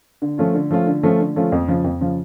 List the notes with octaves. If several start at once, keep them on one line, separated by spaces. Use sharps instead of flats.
D3
F3 A3 C#4 F4
D3
F3 A3 C#4 F4
D3
F3 A3 C#4 F4
D3
F3 A3 C#4 F4
F2
C#3 F3
F2
C#3 F3